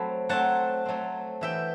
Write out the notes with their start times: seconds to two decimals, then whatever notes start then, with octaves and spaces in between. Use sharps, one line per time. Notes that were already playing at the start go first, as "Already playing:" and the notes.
Already playing: F#3 A3 C4 B5
0.29 F#3 A3 C4 F#5 A5
0.85 F#3 A3 C4
1.41 E3 B3 E4 E5 G5